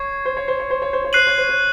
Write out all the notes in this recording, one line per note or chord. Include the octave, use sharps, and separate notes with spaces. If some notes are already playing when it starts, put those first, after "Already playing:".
Already playing: C#5 C#6 G#6 C7
C5
C#5
C5
C#5
C5
C#5
C5
C#5
C5 F#6 C7 D#7 F#7
C#5
C5
C#5